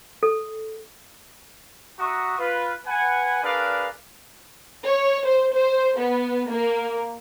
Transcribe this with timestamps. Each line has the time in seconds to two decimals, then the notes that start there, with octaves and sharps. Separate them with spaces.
0.23 A4
1.99 F#4 E5 F#5 A#5 C#6 D#6
2.39 F4 B4
2.86 B4 F#5 G#5
3.43 D4 G#4 A#4 B4 D5 F5
4.86 C#5
5.25 C5
5.54 C5
5.99 B3
6.50 A#3